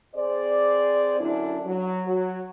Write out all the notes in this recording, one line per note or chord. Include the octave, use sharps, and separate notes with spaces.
C4 G#4 C5 D5
F#2 D3 D4 E4
F#3
F#3